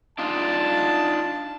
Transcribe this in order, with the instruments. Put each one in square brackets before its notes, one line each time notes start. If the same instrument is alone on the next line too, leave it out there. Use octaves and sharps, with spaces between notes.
[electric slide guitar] D4 D#4 F4 [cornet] A5